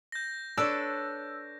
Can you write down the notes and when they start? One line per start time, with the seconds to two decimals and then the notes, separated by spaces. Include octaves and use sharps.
0.12 G6 A#6
0.58 D4 A4 B4 C#5 D5 A5 E6